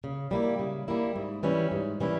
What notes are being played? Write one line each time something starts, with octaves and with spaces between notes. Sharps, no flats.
C#3
G3 A#3 E4
C#3
G3 A#3 E4
G#2
E3 G3 C#4 E4
G#2
E3 G3 C#4 E4